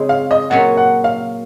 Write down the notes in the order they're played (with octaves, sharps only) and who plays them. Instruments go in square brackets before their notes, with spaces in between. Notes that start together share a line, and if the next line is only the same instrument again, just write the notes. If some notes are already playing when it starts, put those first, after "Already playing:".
Already playing: [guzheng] C#3 G#3 C4 D#4
[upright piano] F5
D#5
[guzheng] A#2 F#3 C#4 [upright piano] F#5
[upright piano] F#5
F5